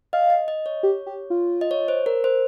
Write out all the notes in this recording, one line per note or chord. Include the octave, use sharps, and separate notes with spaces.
D#5 F5
D#5
D#5
C#5
G4
G4
F4
D#5
C#5
C5
A#4
C5